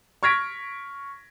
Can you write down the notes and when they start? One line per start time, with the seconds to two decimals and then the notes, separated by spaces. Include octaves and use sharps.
0.23 C#6 F6 G#6 A#6 B6 D7